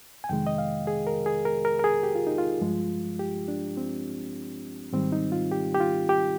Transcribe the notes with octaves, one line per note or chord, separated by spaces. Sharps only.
G#5
F2 C3 D#3 G#3 G5
D#5
F5
G#4
A#4
G#4
A#4
A#4
A#4
G#4
G4
F4
D#4
F4
G2 F3 G#3
G4
D4
C4
G#2 D#3 G3 C4
D#4
F4
G4
G4
F4
G4